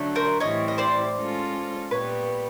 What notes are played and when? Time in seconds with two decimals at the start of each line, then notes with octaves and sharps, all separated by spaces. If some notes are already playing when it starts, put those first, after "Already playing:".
Already playing: D3 F#3 A3 D4
0.15 A#4 C5
0.40 A2 E3 G3 C4 E4 C#5 D#5
0.68 D#5
0.78 C5 D5
1.17 G#3 C#4 F4 A4
1.91 A#2 G3 B3 B4 C#5